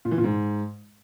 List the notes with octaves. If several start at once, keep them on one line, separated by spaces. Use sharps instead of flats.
A#2
E3
A#2
G#2